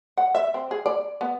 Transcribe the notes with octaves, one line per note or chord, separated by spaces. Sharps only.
F#5
E5
C4
G#4
D5
B3